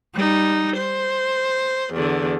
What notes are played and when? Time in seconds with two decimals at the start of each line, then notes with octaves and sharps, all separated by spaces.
0.14 G3 D#4
0.77 C5
1.95 E2 D3